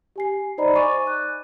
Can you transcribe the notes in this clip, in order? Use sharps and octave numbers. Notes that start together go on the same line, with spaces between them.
G4 G#5 C7
D#4 C5 D5 D#5 A#5 B5
G#5 C#6 D6 A6 D#7
F#6